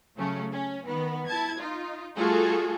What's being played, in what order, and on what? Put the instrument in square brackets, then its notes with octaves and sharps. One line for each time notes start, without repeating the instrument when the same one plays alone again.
[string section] C#3 F#3 A3 C#4
C#4
D#3 B3
E4 A5 G#6
D#4 F4
G3 A3 F4 F#4 G#4 A4